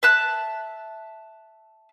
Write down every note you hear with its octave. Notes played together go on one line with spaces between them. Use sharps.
E5 A5 F#6